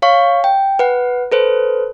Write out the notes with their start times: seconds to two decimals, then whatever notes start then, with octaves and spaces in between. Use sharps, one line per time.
0.02 C#5 F5 C#6
0.44 G5
0.79 B4 F#5
1.32 A4 B4 C5